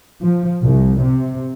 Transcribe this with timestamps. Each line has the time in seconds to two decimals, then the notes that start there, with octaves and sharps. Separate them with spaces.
0.23 F3
0.63 C2
1.03 C3